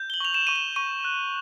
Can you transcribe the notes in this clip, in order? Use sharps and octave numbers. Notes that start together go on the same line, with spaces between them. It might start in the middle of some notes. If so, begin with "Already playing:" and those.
Already playing: G6
G7
F#7
C#6 F7
E7
C#6 D#7
E7
C#6 D#7
F#6